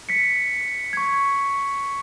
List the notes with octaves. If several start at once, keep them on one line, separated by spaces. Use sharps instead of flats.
B6 C#7
C#6 G#6